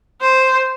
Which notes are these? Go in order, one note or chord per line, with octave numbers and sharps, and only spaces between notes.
C5